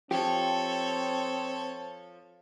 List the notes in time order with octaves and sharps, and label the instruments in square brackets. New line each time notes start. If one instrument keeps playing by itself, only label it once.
[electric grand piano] F3 [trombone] C4 [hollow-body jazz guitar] G4 [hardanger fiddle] A4 C#5